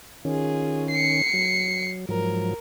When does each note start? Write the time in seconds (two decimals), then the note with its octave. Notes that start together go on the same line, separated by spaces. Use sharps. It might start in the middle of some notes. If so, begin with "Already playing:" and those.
0.25 D#3 C#4 F4 G#4
0.91 C7 C#7
1.33 F#3
2.09 G#2 F3 F#3 A#4